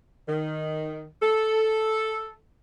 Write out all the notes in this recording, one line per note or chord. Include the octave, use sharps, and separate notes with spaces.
D#3
A4